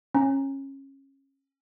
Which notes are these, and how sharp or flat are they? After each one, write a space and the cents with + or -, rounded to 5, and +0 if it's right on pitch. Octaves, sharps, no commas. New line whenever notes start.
C#4 -25 A#5 +0